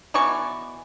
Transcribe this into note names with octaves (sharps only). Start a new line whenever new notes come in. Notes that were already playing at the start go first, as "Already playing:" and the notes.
B2 E3 D5 C#6